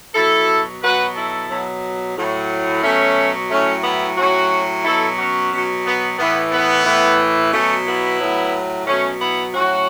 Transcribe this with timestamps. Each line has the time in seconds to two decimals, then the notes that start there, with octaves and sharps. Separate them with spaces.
0.15 B2 F#3 E4 A4
0.82 B2 F#3 F#4 B4
1.15 E4 A4
1.49 B2 F#3
2.16 A2 F#3
2.83 B2 F#3 A3 C#4
3.51 A2 F#3 A3 C#4
3.83 B3 E4
4.17 A2 F#3 C#4 F#4
4.85 B2 F#3 E4 A4
5.18 C#4 F#4
5.52 B2 F#3
5.86 B3
6.18 A2 E3 B3
6.52 B3
6.86 A2 E3
7.52 B2 F#3 A3 C#4
7.87 B3 E4
8.20 A2 F#3
8.87 B2 F#3 A3 C#4
9.21 B3 E4
9.54 A2 F#3 C#4 F#4